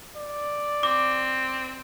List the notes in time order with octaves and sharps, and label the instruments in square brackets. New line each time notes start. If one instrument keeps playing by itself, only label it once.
[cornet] D5
[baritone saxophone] C4 [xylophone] D6